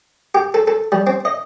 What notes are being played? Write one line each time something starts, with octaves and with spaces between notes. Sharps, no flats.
G4
A4
A4
G3
C4
D#5